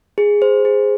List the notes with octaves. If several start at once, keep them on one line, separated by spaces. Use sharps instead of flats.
G#4
C5
G#4